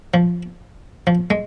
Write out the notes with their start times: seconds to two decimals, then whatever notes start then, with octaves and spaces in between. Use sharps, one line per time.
0.14 F3
1.07 F3
1.30 G#3